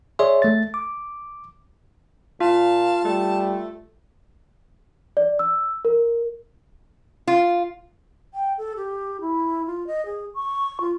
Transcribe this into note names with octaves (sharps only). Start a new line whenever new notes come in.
G#4 C#5 D5 E5 C6
A3 A6
D6
A#2 F4 F5 A5
G3 A3
D5
E6
A#4
F4
G5
A4
G4
E4
F4
D#5
G#4
C#6
F4